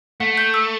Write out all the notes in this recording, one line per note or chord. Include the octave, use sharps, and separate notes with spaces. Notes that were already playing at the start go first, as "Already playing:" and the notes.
A3 F#5
G6
E6